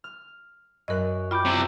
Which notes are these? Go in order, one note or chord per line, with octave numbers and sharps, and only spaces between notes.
F6
F#2 A#4 D#5 F#6
F4 G5 B5 D6 G6
C3 E4